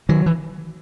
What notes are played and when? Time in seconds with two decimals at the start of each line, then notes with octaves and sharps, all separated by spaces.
0.09 D#3 F#3
0.26 E3